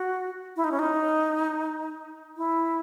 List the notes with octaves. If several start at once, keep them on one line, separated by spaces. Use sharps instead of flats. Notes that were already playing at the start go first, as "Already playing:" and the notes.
Already playing: F#4
E4
D#4
C#4
D#4
E4